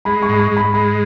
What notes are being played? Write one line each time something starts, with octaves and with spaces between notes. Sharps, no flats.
G#3 B5
C#6
G#2 B5
C#6
G#2
B5
G#3 B5